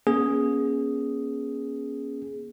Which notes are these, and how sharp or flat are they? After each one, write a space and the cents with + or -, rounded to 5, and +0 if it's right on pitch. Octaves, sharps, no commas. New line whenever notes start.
A#3 +45 C#4 +0 G#4 +0